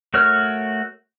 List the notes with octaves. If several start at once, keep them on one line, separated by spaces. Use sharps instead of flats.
A3 F#4 A#4 C#5 F6